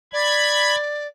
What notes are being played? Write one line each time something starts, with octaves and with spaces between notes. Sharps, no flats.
D5 B5 G#6